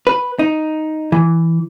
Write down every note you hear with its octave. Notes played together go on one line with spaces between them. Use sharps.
B4
D#4
E3